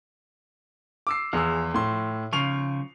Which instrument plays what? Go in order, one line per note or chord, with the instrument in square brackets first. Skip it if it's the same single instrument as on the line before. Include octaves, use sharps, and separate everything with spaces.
[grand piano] D6 E6 C7
[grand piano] E2 G#4 E6 [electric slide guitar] F3
[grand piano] A2 C6
[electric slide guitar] C#3 F3 [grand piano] C#6 C7 F7